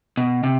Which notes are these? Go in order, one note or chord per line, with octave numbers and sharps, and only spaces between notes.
B2
C3